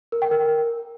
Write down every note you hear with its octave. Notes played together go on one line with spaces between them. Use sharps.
A#4
G5
A#4